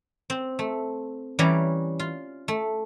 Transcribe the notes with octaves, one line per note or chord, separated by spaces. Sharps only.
C4
A3
E3 G3 C#4 C#5 D5 A#5
F4
A3